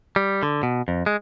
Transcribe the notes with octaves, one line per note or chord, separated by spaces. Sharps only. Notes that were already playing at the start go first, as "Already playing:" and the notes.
G3
D3
B2
F2
G#3